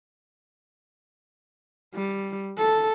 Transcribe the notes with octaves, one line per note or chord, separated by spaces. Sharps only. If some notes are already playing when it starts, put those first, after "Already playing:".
G3
A4